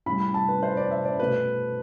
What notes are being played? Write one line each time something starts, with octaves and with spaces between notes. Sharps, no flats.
A2 G3 B5
B5
A5
B4
C5
D5
E5
D5
B2 A3 B4